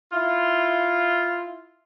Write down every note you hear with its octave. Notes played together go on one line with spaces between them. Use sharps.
E4 F4